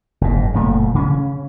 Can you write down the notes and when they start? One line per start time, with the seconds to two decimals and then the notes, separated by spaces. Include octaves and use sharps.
0.21 F#1 G#2
0.54 F#1 A#2 A3
0.94 C#3 C#4